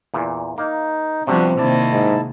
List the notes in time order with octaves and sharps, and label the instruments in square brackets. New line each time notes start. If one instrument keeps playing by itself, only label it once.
[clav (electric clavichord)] E2 A#2
[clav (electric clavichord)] A#3 [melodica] D#4
[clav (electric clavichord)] C3 [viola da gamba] F3 G3 B3 [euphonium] C4 [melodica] D4 F#4
[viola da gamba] C3 D#3 A#3 [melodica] E4 A5 [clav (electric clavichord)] D5
[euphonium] G#2